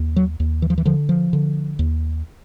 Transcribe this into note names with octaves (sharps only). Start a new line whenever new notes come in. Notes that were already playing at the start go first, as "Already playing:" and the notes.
Already playing: D#2
F#3
D#2
E3
F3
E3
D3 F3
F3
D3
D#2